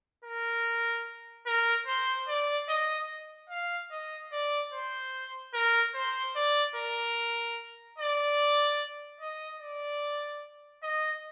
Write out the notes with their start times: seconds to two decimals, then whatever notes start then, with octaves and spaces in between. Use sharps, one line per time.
0.25 A#4
1.47 A#4
1.87 C5
2.28 D5
2.69 D#5
3.50 F5
3.91 D#5
4.32 D5
4.73 C5
5.54 A#4
5.94 C5
6.36 D5
6.76 A#4
7.99 D5
9.21 D#5
9.61 D5
10.83 D#5